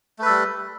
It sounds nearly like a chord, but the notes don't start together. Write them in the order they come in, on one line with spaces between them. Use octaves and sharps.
A3 B4 A4 G3